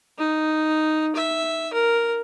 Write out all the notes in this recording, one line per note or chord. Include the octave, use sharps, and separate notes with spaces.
D#4
E5
A#4